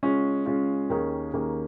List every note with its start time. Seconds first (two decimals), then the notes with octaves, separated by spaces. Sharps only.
0.03 C#3 G#3 C#4 F4
0.46 C#3 G#3 C#4 F4
0.90 D#2 D#3 A#3 C#4 G#4
1.33 D#2 D#3 A#3 C#4 G#4